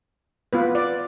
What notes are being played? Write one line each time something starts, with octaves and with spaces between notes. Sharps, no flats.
B3 F4 B4
D5